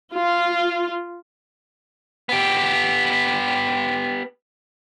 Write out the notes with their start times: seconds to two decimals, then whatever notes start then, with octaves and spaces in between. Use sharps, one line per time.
0.13 F4
2.29 B3 G4